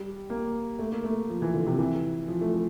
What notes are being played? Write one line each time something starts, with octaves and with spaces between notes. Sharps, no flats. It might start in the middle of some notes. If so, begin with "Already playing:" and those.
Already playing: G3
A#3
A3
A#3
A3
F3
E3
D3
C3
E3
F3
A3
A3